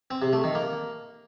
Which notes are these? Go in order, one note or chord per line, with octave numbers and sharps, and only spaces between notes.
C4
C3
A3
D#3
A#3